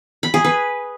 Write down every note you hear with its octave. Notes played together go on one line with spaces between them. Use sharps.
B5
G#4
B4